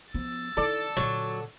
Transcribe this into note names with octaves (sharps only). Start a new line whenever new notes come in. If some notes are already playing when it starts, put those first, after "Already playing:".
F3 B3 E6 A6
D#3 E4 A4 D5
A#2 D3 F#3